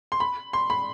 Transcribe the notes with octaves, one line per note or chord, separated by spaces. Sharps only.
C6
B5
C6
B5